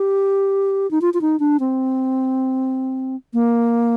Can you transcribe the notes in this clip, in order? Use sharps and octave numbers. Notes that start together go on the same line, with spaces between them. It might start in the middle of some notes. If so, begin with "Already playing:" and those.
Already playing: G4
D#4
F4
F4
D#4
D4
C4
A#3